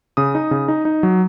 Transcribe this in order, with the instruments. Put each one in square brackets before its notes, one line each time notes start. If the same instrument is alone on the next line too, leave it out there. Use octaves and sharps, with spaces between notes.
[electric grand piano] C#3 D#6
D#4
C#3
D#4
D#4
F#3